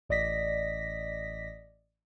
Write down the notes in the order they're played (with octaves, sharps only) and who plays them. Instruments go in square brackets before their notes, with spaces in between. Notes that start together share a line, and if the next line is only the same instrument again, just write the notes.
[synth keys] A1 D5 D#5 A#6 B6